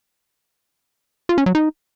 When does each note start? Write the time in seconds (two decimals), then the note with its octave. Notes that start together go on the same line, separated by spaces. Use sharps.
1.29 F4
1.38 C#4
1.46 F#3
1.55 D#4